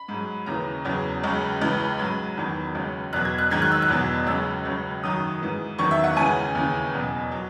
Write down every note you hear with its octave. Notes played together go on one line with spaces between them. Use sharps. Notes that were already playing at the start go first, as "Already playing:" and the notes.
Already playing: B5
G#2 F#3
D#2 C#3 E3 A#5
E2 C#3 F#3
C#2 C#3 F#3
C#2 C#3 E3
G#2 F#3 B5
E2 D#3 F#3
C#2 C#3 F#3
E2 B2 F#3 F#6
G#6
F#6
G#2 D#3 F#3 G#6
F#6
E6
F#6
E2 B2 F#3
C#2 C#3 F#3 E6
C#2 C#3 F#3
F#2 D#3 F#3 D#6
G#2 E3
E2 D#3 F#3 C#6
E5
F#5
C#2 C#3 E3 G#5
D#2 C#3 E3
E2 B2 F#3
F#3